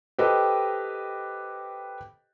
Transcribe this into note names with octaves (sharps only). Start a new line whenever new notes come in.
G4 A4 B4 C5 D#5 G5